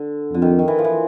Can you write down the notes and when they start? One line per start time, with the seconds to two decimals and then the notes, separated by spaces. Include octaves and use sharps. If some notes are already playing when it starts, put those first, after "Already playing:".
Already playing: D3
0.33 F2 D3
0.42 D#3
0.59 D#3
0.68 E3
0.79 F3
0.84 E3